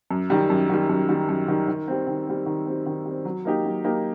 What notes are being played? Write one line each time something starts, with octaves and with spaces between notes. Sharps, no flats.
F#2
D#3 G3
F#2
D#3 G3
F#2
D#3 G3
F#2
D#3 G3
D#3
G3 C4
D#3
G3 C4
D#3
G3 C4
D#3
G3 C4
F#3
A#3 D#4 G4
F#3
A#3 D#4 G4